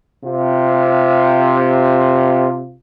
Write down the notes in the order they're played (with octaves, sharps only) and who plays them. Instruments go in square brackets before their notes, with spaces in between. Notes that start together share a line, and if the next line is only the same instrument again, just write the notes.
[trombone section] C3 F4